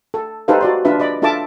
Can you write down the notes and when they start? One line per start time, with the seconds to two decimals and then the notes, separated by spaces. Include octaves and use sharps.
0.14 A4
0.48 D#4 G4 A4 B4 C5 F5
0.61 F#4 D5 C6
0.85 D4 F4 B4 E5
1.00 D5 D#5 B5 D6
1.22 D4 F4 A4 E5 A5 D6